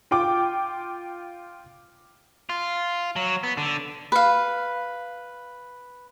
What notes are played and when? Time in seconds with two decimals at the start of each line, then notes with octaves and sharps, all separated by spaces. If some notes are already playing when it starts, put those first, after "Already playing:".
0.11 F4 G5 D6
2.49 F4
3.16 F#3
3.43 B3
3.57 D3
4.12 B4 F5